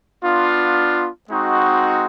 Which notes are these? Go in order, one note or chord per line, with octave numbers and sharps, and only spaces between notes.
B3 D4 F4
G#3 C4 D#4 F#4